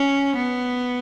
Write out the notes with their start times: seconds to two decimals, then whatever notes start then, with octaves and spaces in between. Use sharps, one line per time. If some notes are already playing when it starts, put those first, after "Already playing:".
Already playing: C#4
0.36 B3